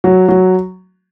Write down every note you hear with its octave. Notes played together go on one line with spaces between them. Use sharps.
F#3
F#3